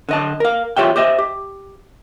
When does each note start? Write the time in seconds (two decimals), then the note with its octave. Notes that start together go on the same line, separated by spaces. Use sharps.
0.09 D3 D#5 A5
0.40 A#4 F5
0.77 F4 G4 C#5 E5 G5
0.96 G4 C5 D#5 E5
1.18 G4